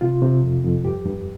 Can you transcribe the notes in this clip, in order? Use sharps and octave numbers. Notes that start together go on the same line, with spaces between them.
C3 F4
C3
F2
F2
G2 G4
G2